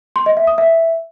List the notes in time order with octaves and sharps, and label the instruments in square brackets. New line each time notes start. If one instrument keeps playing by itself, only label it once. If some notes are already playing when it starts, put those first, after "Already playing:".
[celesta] C6
D#5
E5
D#6
E5